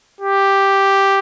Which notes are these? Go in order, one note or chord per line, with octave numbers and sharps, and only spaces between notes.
G4